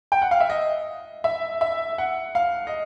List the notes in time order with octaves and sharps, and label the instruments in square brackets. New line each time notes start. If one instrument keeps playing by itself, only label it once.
[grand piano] G5
F#5
F5
E5
D#5
E5
E5
F#5
F5
D#5